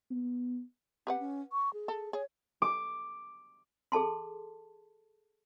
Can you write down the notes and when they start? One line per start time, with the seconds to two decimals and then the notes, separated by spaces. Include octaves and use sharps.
0.11 B3
1.07 C4 G4 B4 F#5
1.19 C#4
1.52 C#6
1.73 G#4
1.88 A4
2.13 G#4 C#5
2.62 D6
3.92 G#4 A4 A5 C6